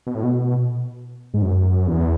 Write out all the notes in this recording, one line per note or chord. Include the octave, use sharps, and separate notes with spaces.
B2
A2
B2
G#2
F#2
E2